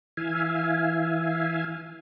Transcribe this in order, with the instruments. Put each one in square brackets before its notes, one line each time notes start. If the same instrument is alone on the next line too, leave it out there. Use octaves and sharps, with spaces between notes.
[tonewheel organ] E3 E5 F5 G#5